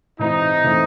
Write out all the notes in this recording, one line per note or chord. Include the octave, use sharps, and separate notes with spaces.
G#2 E3 C4 D#4 E4
E3 A3 C4 E4